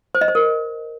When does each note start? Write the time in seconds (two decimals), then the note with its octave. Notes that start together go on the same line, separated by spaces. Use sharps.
0.15 C5
0.21 D#5
0.28 C5
0.35 A#4